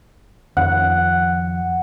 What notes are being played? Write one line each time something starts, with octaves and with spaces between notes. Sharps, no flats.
F2 D#3 F3 F#5